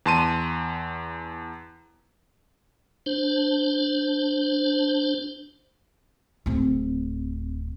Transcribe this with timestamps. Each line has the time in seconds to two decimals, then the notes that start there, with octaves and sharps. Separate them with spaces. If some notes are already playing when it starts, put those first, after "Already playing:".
0.06 E2 A5 C6 D#7
3.06 D4 C5
6.46 D1 C4